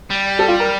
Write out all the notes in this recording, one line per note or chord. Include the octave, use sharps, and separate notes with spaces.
G3
A4
F4
A#4